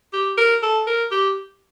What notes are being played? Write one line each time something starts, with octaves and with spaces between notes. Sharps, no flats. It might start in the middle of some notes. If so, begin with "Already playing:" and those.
G4
A#4
A4
A#4
G4